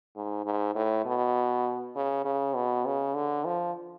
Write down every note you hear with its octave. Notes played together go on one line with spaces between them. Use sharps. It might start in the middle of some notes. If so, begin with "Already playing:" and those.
G#2
G#2
A2
B2
C#3
C#3
B2
C#3
D3
F3